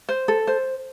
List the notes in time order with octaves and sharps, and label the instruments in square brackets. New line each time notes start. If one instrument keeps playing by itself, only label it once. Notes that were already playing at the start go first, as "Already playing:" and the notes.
[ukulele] C5
A4
C5